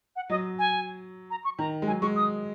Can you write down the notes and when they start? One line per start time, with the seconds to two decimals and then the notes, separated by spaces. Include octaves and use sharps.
0.16 F#5
0.30 F#3 D#5
0.59 G#5
1.31 A#5
1.44 C#6
1.59 D#3 A#5
1.82 G#3
1.87 F#3 G#5
2.02 G#3 C#6
2.16 D#6